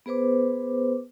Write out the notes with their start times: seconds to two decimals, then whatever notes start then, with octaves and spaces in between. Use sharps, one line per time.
0.06 B3 G#4 B4 C5 D6